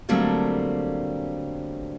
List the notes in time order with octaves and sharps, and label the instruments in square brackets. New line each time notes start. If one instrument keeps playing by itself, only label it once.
[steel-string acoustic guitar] D3 F#3 G3 A3 A#3 C4